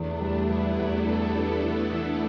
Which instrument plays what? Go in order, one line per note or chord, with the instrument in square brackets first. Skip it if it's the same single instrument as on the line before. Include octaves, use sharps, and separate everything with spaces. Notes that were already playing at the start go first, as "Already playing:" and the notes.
Already playing: [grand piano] E2 [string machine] A3 D4
[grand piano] G3
[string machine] B3 E4
[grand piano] G3
[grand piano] E2 [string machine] E4 A4
[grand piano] G3
D4
E3
E3